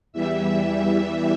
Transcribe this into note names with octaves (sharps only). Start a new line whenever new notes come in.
E2 E3 G3 E5